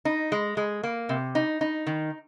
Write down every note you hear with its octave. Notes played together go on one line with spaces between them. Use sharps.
D#4
G#3
G#3
A#3
C3
D#4
D#4
D#3